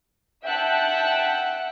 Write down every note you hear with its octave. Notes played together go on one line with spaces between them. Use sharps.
E5 F#5 G5 A5 F#6